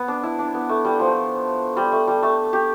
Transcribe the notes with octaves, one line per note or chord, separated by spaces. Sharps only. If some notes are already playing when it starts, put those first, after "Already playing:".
Already playing: B3
D4
E4
D4
B3
A3
G3
F3
G3
A3
G3
A3
G4